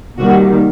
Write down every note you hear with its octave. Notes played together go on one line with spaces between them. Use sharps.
C3 D#3 G3 A#3 F#4